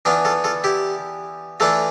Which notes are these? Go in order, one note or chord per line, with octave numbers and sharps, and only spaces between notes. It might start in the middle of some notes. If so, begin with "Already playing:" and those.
E3 B3 D4 F4
F4 A4
F4 A4
E4 G4
E3 A3 D4 F4 A4